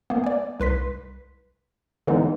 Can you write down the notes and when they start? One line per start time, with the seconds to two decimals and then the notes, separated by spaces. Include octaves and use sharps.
0.10 A#3 B3
0.24 D5 G#5
0.60 C2 B4 C6 B6
2.07 D3 E3 G#3 B3 C4 D#4